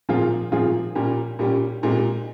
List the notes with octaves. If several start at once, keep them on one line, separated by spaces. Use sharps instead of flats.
A#2 F3 C4 F4 G#4
A#2 F3 C4 F4 G#4
A#2 G3 C#4 G4
A#2 G3 C#4 G4
A#2 G#3 C4 G4